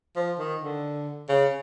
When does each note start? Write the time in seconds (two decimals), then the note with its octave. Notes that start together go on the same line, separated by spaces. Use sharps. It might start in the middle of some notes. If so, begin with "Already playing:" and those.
0.16 F3
0.39 D#3
0.61 D3
1.29 C#3